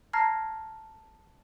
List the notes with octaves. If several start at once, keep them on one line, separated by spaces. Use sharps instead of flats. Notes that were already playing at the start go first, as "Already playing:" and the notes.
A5 A#5 F6 G#6 A#6 C7